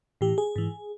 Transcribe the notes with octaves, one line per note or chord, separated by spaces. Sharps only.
A2 E3 G4
G#4
G#2 E3